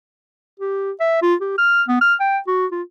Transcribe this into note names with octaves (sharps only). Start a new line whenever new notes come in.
G4
E5
F4
G4
F6
B3
F6
G5
F#4
F4